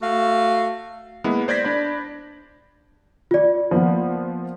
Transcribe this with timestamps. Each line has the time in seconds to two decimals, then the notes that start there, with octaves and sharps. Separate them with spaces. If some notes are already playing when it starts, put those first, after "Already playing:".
0.01 A3 F#4 F5
1.24 G#3 A#3 B3 E4
1.48 C5 D5 G6 G#6 A#6 B6
1.64 D4 D5 B5
3.31 F4 D5
3.71 F3 A#3 B3